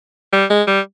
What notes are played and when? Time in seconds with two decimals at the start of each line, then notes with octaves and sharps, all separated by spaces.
0.33 G3
0.50 G#3
0.67 G3